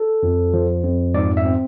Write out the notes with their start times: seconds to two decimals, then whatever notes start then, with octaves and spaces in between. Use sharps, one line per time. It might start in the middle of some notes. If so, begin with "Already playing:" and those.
Already playing: A4
0.23 F2
0.53 F3
0.84 F2
1.14 G#2 D5
1.37 E5
1.45 C4